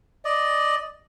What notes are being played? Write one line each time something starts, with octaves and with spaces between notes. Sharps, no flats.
D5 D#5